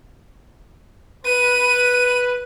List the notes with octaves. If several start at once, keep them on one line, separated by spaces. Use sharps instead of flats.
B4 D#7